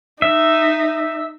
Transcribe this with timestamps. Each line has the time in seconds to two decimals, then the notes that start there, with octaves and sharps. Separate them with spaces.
0.22 D#4 E5